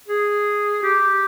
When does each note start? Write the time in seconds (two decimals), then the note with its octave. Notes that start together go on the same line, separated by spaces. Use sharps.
0.08 G#4
0.83 G4